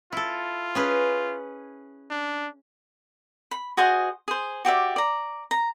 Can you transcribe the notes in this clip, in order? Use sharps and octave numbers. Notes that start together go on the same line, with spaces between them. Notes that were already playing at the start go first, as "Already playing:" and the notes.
E4 F4 A4
C#4 G#4 B4
D4
B5
F#4 G#4 C5 D#5
G#4 C5
F#4 G4 D5 E5
D5 A#5
A#5